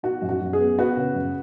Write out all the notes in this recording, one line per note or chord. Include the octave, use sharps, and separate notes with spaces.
D#4 F#4
F#2
F#4
F#2
G#4
B3
B3 F#4 B4
C#3
F#2